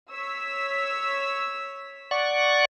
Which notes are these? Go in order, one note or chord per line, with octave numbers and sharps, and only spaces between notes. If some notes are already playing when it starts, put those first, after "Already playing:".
C#5 E6 B6
D5 F#5 C#6